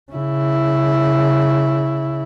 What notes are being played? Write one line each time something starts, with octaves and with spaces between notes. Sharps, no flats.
C#3 E4